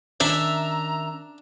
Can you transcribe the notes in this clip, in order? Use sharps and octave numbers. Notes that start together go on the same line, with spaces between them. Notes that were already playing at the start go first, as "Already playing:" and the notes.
D#3 C#4 D4 E5 A#5